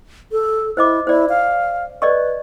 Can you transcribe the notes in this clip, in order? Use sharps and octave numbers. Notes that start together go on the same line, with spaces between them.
A4
E4 C5 D#5 D6
E4 C5 D5
F5
B4 D5 D#5 C#6